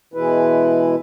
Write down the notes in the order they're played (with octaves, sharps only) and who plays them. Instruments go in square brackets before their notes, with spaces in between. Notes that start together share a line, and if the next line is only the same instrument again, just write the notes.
[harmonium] B2 E3 G#3 E4 B4